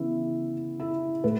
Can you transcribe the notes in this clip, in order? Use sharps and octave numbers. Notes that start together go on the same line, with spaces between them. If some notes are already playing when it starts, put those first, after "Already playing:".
Already playing: C#3 E3 B3 E4
E4
A2 B4